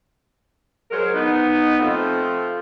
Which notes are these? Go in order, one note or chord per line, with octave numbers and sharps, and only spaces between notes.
F#3 G#3 A#4 C5
B3 D#4
F3 A3 C4 F4